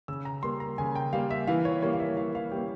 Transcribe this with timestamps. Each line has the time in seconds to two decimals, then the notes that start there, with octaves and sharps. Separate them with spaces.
0.08 C#3 E6
0.25 A#5
0.43 G3 A#3 C6
0.60 A#5
0.78 C#3 G#5
0.96 G5
1.13 G3 A#3 F5
1.31 E5
1.47 E3 F5
1.65 C#5
1.82 G3 A#3 C#5
1.93 F5
2.00 E5
2.17 E3 F5
2.35 F5
2.52 G3 A#3 G5